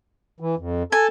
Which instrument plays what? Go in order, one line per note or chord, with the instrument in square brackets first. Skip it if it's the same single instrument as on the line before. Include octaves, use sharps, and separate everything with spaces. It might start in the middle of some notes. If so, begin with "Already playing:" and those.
[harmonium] E3
F2
[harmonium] A4 A5 [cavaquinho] G#5